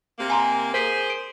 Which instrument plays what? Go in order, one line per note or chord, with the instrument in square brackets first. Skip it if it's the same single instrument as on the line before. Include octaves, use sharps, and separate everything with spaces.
[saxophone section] C3 A#3
[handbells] G#5 A#5 C6
[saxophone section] G#4 C5 [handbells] A#4 B6 D7
[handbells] D7